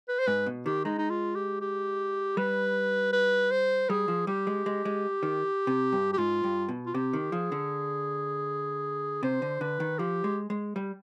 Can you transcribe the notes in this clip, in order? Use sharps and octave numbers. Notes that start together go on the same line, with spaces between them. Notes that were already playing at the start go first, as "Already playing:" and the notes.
B4
C5
G#2 B4
B2
D#3 G4
G#3 D#4
D#4
F4
G4
G4
G3 B4
B4
C5
G3 G#4
F3
G3 G4
G#3
G#3
G#3
D#3
C3
G2
G4
G#2 F4
G2
B2
F4
C3 G4
D#3
F3 G#4
D3
C3 C5
D3
D3 B4
D#3
F3 G4
G#3
G#3
G3